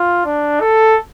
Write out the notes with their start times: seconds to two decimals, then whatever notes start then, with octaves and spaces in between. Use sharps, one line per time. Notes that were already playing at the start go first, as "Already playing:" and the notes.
Already playing: F4
0.25 D4
0.61 A4